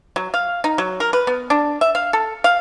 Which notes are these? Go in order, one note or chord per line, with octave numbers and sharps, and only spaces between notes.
F#3
F5
D#4
F#3
A#4
B4
B3
D4
E5
F5
A4
F5